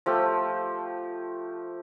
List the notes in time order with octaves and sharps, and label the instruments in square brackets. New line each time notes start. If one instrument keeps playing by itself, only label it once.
[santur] F3 A3 G4